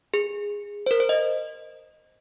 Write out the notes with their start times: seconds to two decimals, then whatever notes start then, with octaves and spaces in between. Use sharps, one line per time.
0.14 G#4
0.86 C5
0.91 A#4
1.00 C5
1.09 D#5